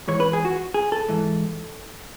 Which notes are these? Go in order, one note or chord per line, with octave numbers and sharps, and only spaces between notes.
G#2 E3 C#5
B4
G#4
F#4
G#4
A4
G#2 E3